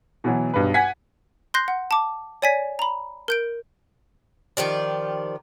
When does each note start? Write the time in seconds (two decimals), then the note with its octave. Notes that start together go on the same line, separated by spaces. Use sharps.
0.24 B2 E3 F#3
0.54 B1 G2 B4
0.74 F#5 G#5 G#6 B6
1.54 C6 F#6 G6 A#6 C7
1.68 F#5
1.91 A5 D6
2.42 C#5 D5 G#5 G#6 B6
2.79 A#5 B5
3.28 A#4 G6 D7
4.57 D#3 F3 G4 D5